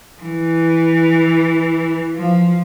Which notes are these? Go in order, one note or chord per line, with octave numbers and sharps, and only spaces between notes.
E3
F3